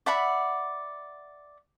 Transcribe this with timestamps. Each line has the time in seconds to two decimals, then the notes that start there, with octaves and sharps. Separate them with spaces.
0.06 D5 E5 F#5 B5